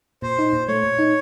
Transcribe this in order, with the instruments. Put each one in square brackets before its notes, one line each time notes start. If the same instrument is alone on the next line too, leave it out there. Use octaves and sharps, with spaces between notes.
[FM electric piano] A#2 [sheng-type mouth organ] C5
[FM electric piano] D#4
A#2
[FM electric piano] A3 [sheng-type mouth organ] C#5
[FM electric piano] A#2
D#4